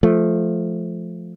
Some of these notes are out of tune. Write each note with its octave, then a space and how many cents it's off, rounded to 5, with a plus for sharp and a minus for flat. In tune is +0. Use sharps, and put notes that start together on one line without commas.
F3 +0 A3 -15